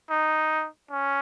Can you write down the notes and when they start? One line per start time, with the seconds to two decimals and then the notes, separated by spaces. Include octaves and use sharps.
0.10 D#4
0.91 C#4